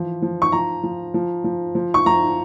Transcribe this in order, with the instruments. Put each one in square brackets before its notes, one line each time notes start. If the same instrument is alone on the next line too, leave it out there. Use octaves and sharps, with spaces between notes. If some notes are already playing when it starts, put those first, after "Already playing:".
Already playing: [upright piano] E3 F3
F3
C#6
F3 A#5
F3
F3
F3
F3
C#6
F3 A#5